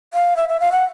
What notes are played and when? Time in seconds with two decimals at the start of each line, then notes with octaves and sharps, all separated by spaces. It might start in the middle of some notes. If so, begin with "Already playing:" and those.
0.14 F5
0.37 E5
0.49 E5
0.60 F5
0.72 F#5